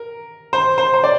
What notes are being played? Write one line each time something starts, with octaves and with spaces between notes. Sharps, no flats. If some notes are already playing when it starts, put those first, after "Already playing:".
Already playing: A#4
C5
C5
C5
D5